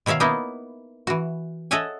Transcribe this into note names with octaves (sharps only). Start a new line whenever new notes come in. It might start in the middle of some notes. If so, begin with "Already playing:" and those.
B2 D#3 C#5 E5 F5
A#3 B3 D#4 E4
E3 F#4
A4 C#5 D#5 E5 F#5 G#5